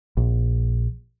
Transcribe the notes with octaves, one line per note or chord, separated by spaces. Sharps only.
A#1